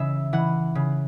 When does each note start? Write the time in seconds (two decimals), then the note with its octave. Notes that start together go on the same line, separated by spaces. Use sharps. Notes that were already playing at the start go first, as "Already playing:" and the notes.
Already playing: C#3 E3 E5
0.33 E3 F#5
0.75 C#3